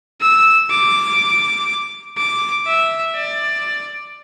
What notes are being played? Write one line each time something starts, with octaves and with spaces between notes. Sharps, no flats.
E6
D6
D6
E5
D5